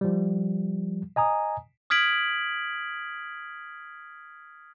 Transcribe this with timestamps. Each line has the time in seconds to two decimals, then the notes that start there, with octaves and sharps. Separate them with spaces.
0.01 F3 G3
1.16 D#5 G#5 A#5 D#6
1.90 D#6 F6 G#6 B6 D7 F#7